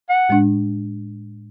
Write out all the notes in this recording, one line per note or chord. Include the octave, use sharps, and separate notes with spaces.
F#5
A2 G#3 D4